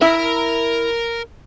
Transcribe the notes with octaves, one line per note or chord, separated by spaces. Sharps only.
E4 A#4 E5 A#5